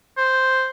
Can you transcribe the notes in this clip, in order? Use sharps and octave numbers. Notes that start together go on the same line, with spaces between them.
C5